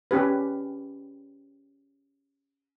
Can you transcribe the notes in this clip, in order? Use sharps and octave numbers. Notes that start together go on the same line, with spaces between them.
C#4 G4 B4